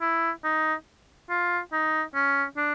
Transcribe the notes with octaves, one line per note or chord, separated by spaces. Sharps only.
E4
D#4
F4
D#4
C#4
D4